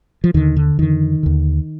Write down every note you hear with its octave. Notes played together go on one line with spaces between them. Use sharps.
F3
D#2 D3 D#3
D3
F2 D3 D#3
D#2 D3